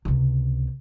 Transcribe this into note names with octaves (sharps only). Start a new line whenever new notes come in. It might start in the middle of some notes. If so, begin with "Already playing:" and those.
C#2 C3